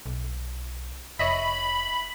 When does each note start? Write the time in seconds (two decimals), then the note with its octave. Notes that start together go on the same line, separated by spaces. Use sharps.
0.06 B1
1.19 F1 C#5 D#5 E5 B5